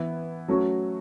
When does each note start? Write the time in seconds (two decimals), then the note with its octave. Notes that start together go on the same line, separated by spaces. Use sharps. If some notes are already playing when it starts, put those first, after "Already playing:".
Already playing: E3 B3 E4
0.48 F#3 A3 C#4 F#4